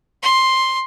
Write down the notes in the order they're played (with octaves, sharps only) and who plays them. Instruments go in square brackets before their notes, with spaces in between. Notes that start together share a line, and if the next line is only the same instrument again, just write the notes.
[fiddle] C6